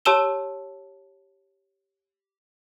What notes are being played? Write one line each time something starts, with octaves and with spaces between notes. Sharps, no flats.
G4 C#5 A5 E6 E7 G7